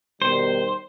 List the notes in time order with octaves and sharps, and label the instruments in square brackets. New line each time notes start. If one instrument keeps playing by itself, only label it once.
[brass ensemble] B2 D#3 G3 [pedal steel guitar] C5